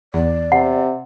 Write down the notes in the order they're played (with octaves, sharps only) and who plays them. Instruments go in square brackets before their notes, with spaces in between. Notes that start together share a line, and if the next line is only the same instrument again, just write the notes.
[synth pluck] E2 [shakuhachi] D5
[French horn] C3 [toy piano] F#5